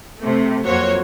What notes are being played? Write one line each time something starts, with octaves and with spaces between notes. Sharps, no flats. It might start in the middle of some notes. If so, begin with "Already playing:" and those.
C3 A3
F2 F#3 A#3 F#4 C5 C#5